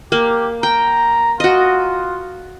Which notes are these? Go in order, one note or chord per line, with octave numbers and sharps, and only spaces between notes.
A#3 G4
G5 A#5
F4 F#4 D#5